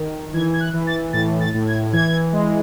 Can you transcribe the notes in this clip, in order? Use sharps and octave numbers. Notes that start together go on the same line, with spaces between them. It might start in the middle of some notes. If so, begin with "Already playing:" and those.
Already playing: D#3
E3 G#6
G#6
F#6
E3
A6
A2 A6
A6
A2
G#6
E3 G#6
G#3